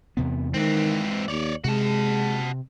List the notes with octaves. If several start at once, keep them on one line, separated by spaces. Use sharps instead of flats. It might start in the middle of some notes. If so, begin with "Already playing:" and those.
E2 C3 B3
D#3 E3 G#3 C4
D#2 C#5 D5
C3 G#3 F#4 A5